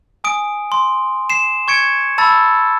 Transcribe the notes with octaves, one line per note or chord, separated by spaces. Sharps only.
G#5 D#6 D7
C6
C7 E7
C#6 G#6 C#7 D7
A5 B5 E6 A6